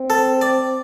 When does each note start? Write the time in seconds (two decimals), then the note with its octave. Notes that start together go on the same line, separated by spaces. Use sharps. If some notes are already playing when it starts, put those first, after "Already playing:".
Already playing: C4
0.10 A4
0.41 D5